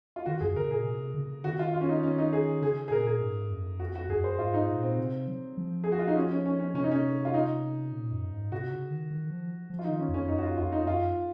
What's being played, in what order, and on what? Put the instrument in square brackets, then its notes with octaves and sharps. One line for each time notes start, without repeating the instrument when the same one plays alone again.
[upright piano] F4
[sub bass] D#3 [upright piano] F#4
[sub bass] F#2 [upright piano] G#4
[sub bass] C#3 [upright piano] A#4
[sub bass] A#2 [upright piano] G#4
[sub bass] C3
C#3
[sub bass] D#3 [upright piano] F#4
[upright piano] F4
F4
C#4
D#4
C#4
D#4
G#4
[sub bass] C#3 [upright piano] G#4
[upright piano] G#4
[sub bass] A#2 [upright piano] A#4
[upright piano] G#4
[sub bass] G#2
F#2
[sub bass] F2 [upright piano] F#4
[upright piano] F#4
[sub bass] F#2 [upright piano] G#4
[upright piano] C5
[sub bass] G#2 [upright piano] F4
[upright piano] D#4
[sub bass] A#2
[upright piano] C4
[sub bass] C3
F#3
F3
[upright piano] G#4
F#4
F4
D#4
C#4
C#4
C#4
C#4
[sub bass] C3 [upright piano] C#4
[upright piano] D#4
C#4
F4
D#4
[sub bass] A#2
F#2
G#2
[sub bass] C3 [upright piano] F#4
[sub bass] C#3
D#3
D#3
F3
F3
[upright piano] F4
D#4
[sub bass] D#3
[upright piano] C#4
[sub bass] F2
[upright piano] C#4
[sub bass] F#2 [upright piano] D#4
[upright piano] F#4
F4
[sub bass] F2 [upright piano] F4
[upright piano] D#4
[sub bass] F#2 [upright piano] F4